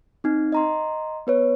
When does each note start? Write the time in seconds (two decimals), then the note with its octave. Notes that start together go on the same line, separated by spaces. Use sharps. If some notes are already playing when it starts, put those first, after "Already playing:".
0.24 C4 D#4
0.52 D#5 A#5 C6
1.27 B3 B4 C#5